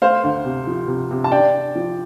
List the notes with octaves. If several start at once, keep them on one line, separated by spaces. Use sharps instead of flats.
A3 C5 F5
D2
C3
F3
C3
C3
A5
D4 D5 G5
D4
F3